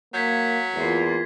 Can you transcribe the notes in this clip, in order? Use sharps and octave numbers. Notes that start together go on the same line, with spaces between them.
F#3 A#3 G6 G#6 B6
E2 A#3 F4